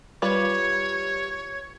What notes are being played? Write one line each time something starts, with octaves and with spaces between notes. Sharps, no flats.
G3 F4 B4 C#5